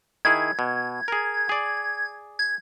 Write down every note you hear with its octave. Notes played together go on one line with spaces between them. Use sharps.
D#3 E4 G#4 G#6
B2
G#4 A#4
G#4 D5
G#6